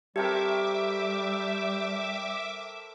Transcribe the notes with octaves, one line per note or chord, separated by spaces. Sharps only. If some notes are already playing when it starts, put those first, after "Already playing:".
G3 A3 C4 G4 A#4 E5 D6